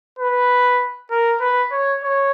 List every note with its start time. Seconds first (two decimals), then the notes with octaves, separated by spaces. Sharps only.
0.19 B4
1.11 A#4
1.41 B4
1.72 C#5
2.03 C#5